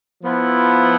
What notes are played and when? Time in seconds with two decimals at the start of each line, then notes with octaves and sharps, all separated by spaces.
0.23 F3 B3 E4